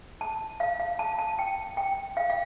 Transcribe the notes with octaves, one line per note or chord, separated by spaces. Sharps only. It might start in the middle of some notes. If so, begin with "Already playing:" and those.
A5
F5
F5
A5
A5
G5
G5
F5
F5